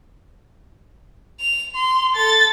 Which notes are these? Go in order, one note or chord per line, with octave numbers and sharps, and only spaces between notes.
F7
C6
A4 A6